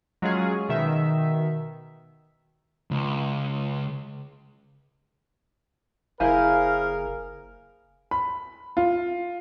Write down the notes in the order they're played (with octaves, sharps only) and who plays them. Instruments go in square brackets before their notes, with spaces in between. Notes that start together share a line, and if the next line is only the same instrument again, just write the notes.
[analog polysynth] F#3 G#3 C#4 F4 G#4
B2 D#3 E5
[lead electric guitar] C#2
[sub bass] F#1 [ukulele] E4 C5 G#5 [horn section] G#4 A#4 [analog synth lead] F5
[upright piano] B5
F4